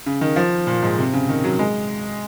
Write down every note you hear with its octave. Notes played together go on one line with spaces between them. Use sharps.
C#3
D#3
F3
A#2
G#2
C3
C#3
D#3
F#3
G#3